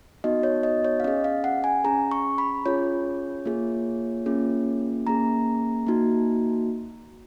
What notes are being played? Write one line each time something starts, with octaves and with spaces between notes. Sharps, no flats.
B3 D#4 F#4 D#5
C#5
D#5
C#5
F5
C#4 G#4 D#5
F5
F#5
G#5
C#4 G#4 A#5
C#6
B5
C#4 F4 G#4 C#5
A#3 F4 G#4
A#3 C#4 F4 G#4
A#3 C#4 G#4 A#5
A#3 D#4 F#4